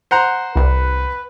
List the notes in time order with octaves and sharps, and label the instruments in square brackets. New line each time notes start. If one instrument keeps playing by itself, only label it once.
[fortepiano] C5 F#5 A#5
[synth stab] C2 [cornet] B4